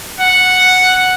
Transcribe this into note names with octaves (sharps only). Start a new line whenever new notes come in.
F#5